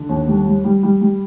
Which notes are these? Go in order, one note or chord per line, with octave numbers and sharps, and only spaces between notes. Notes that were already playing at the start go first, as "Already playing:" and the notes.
Already playing: D3
D#2
G3
G3
G3
G3
G3